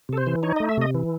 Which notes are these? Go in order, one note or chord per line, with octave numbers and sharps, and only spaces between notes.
C3 A4
C5
E3
D#4 C#5
A3 D#5
E5
C3 D#5
E3